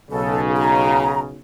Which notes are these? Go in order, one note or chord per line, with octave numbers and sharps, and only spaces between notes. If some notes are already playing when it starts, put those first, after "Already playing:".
B1 C#3 A4
A#5